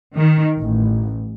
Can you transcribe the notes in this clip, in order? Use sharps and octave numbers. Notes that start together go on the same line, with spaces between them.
D#3
A1